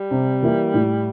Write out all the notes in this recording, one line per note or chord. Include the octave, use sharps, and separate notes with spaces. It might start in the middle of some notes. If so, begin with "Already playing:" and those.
Already playing: G3
C3
E3 A#3 E4
A2